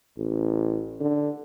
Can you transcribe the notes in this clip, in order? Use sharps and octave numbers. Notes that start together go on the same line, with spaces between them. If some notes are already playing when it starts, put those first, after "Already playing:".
A1
D3